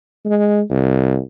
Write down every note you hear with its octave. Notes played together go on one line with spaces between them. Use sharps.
G#3
C2